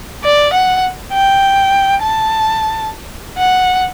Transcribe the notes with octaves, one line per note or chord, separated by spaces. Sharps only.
D5
F#5
G5
A5
F#5